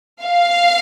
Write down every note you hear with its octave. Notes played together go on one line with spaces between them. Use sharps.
F5